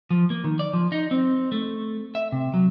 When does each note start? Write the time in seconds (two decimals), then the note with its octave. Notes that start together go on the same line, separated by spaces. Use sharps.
0.11 F3
0.30 A#3
0.44 D#3
0.59 D5
0.73 F3
0.92 D#4
1.11 C4
1.52 A3
2.15 E5
2.32 C3
2.54 F#3